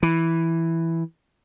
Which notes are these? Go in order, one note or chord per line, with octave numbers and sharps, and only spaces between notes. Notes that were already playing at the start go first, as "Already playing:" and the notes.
E3